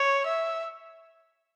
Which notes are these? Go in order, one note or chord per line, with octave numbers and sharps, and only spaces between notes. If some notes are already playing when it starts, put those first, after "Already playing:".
Already playing: C#5
E5